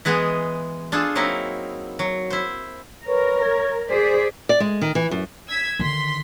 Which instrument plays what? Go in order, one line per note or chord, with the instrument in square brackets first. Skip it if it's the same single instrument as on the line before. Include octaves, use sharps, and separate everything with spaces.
[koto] E3 G#3 B3 G#4
D4 F4 G#4 A4
F#3 A#3 C4 D#4 E4
F#3
E4 C5
[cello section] A#4 [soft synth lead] B4 [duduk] C#5
[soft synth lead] G#6
[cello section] G#4 C5 D5 [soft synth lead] B6
[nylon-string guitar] D5
G#3
D#3
E3
F#2
[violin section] E6 G#6 B6
[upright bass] D3 D#3 [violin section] C6 B6